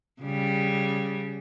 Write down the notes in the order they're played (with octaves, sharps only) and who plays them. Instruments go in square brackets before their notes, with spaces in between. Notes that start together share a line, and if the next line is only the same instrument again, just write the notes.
[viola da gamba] C#3 G3